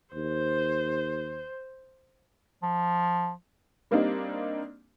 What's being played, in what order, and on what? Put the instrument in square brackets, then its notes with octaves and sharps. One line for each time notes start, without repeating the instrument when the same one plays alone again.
[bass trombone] D#2 [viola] C5
[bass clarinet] F3
[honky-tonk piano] G3 A#3 C4 D4 D#4